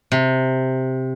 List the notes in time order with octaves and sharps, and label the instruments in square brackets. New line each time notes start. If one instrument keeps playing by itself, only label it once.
[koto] C3